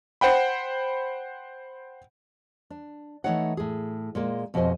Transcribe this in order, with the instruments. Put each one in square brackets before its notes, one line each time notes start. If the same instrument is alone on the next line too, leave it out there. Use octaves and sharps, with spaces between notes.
[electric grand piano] C5 F#5 G5 B5
[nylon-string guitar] D4
E3 G#3 A3 D#4 C#5 F#5
A2 G#4
A#2 G#3 A#3
F2 B2 G3 C5 D#5 G#5